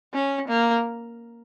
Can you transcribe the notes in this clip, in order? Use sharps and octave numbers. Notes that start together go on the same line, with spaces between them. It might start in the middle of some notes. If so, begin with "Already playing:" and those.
C#4
A#3